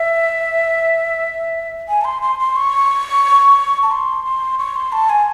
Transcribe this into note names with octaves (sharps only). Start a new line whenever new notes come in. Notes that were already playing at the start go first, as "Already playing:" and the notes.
Already playing: E5
G#5
A5
C6
C6
C6
C#6
A5
C6
C6
C#6
C6
A5
G#5